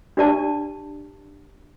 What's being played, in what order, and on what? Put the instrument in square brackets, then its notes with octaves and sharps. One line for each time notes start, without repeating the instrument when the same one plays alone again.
[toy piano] D4 G4 D5 A5